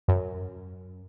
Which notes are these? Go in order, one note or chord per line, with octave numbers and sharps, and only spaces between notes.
F#2